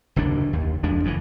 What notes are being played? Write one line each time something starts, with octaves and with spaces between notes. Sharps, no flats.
F#1 D#2 A2 D4
D#2
F2 F3 G#3 D4
F#1 F2 B2 E3